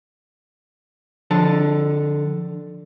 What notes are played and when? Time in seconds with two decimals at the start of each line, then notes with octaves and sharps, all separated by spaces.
1.31 D3 F3 A5